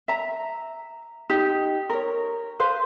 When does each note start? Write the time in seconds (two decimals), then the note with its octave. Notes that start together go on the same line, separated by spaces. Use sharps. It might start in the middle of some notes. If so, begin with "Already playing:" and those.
0.08 E5 A#5
1.30 D#4 G4
1.90 A#4 C#5
2.60 B4 C5 F5